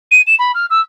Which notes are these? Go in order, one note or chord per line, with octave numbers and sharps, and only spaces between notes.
D#7
E7
B5
F6
E6